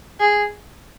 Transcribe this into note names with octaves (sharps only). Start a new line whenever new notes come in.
G#4